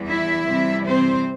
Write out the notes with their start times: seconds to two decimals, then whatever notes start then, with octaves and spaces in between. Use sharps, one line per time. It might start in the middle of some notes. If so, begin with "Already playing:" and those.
Already playing: E2 E3 G3
0.09 E4 E5
0.47 C3 E3 G3 C4
0.83 C4 C5